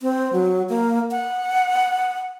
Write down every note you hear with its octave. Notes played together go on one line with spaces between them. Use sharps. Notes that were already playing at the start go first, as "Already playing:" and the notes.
C4
F#3
A#3
F#5